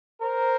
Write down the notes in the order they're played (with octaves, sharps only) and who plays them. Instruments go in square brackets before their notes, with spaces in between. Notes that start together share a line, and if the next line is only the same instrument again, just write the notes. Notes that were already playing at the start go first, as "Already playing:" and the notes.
[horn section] A#4 C5